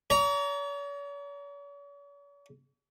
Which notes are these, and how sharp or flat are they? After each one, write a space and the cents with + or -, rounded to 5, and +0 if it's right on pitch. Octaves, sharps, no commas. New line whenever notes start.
C#5 +45 A#5 +0